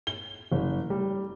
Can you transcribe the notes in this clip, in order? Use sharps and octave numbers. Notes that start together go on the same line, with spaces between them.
G7
F#1
G3